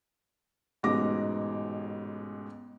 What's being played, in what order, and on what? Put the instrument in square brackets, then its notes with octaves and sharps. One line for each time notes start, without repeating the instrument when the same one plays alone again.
[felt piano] A1 G#2 B2 D6 A#6